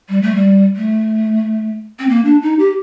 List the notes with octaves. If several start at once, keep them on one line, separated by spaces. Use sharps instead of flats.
G3
A3
G3
A3
C4
A#3
D4
D#4
G4